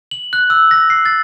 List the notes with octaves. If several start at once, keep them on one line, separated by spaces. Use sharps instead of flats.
F#7
F#6
E6
A#6
C7
A6